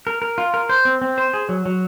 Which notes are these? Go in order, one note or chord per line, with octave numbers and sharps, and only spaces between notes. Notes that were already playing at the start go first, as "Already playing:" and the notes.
A#4
A#4
F4
A#4
C5
C4
C4
C5
G#4
F#3
F#3